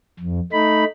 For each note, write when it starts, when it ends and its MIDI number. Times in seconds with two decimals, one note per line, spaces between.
0.19 0.39 41
0.52 0.85 57
0.52 0.85 63
0.52 0.85 83